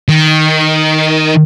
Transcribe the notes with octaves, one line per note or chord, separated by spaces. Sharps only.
D#3